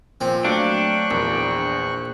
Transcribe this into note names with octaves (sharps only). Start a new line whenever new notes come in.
A#2 F3 C4
F#3 A3 D4 F5 G5 C#6 F#6
A#1 E2